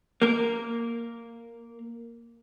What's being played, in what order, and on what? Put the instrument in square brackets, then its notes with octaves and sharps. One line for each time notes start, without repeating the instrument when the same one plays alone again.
[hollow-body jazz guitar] A#3 A#4